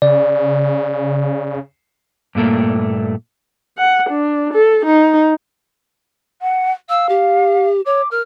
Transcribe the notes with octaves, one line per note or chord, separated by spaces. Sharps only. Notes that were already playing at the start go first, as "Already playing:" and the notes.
C#3 D5
G2 A#2 A3 A#3
F#5
D4
A4
D#4
F#5
F5 E6
G4
C#5 D6
A#4 F6